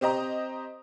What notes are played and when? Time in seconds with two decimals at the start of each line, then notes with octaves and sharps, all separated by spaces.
0.01 C4 G4 C5 D#5 A#5